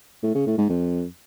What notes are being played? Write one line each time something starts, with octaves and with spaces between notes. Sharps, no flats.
A2
C#3
A2
G#2
F2